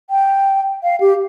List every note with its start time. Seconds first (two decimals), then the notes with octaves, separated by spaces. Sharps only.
0.10 G5
0.83 F5
1.01 G4